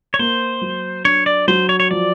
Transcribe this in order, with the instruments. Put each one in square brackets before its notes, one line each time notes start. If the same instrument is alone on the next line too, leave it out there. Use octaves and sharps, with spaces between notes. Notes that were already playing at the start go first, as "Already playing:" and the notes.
[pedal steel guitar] C#5
[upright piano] A#3 [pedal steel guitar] C5
[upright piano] F#3
[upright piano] D4 [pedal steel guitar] C#5
[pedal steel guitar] D5
[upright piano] F#3 [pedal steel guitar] C5
[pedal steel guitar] C#5
C#5
[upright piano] F3 [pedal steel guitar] D5